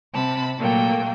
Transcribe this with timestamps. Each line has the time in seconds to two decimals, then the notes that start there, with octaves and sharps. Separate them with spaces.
0.13 C3 A5 B5
0.58 A#2 F#3 A3 A#3 G5